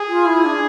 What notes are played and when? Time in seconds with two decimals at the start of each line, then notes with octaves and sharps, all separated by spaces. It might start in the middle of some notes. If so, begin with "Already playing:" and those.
Already playing: G#4
0.08 F4
0.25 E4
0.44 D4